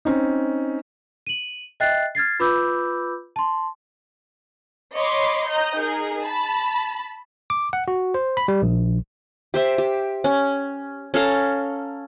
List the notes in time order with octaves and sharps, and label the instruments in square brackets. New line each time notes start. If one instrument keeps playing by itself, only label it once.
[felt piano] C4 C#4 D#4
[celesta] D#7 F#7
D#5 E5 G5 F#6 A6 C7
F6 G#6 A6 C7
F4 B4 B5 D6 E6 G6
A5 C6
[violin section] C#5 D#5 B5 C6 D6
D#5 A#5 G6
D#4 G#4 A#4
A5 B5
[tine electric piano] D6
F#5
F#4
C5
B5
G3
A#1
[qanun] G4 C5 E5
G4
C#4
C#4 A4 F5 A#5